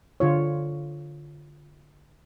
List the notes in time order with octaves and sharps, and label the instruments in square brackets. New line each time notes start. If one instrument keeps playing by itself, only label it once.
[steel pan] D3 F4 C#5